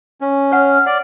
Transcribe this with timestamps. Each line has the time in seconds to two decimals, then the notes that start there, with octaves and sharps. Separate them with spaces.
0.21 C#4
0.52 C#5 F#5 F6
0.86 D5 F#5